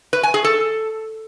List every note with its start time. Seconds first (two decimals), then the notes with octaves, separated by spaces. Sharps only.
0.13 B4
0.23 G#5
0.34 G#4
0.44 A4